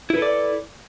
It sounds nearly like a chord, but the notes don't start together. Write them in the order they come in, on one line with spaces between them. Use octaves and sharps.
E4 B4 A4 D5